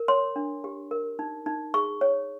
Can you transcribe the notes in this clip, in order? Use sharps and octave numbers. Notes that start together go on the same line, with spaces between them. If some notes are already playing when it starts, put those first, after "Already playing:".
Already playing: A#4
C#5 C6
D4
G4
A#4
D#4
D#4
G#4 C#6
C#5